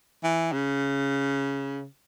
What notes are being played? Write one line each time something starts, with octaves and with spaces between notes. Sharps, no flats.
E3
C#3